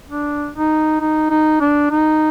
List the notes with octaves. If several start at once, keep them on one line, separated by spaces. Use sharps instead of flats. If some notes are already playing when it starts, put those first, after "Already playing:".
D4
D#4
D#4
D#4
D4
D#4